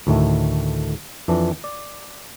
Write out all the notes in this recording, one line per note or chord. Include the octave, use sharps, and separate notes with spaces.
D2 A2 D#3 A3
F2 E3 D4
D5